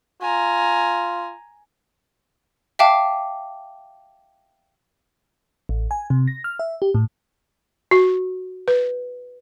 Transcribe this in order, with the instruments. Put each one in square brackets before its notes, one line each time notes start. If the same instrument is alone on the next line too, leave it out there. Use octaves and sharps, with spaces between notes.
[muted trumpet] F4 [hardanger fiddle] G#5 A#5
[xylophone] E5 F5 G5 A5 D6
[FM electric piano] A1
G#5
C3
A#6
F6
E5
G4
A2
[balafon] F#4
B4